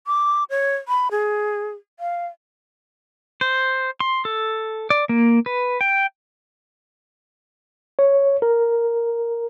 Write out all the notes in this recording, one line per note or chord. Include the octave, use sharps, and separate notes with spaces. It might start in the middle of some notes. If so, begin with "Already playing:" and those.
D6
C#5
B5
G#4
F5
C5
C6
A4
D5
A#3
B4
G5
C#5
A#4